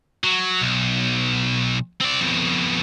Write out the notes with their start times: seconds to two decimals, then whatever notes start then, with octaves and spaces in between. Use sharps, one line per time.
0.24 F#3
0.61 B1
2.01 C4 D5
2.21 F2 B2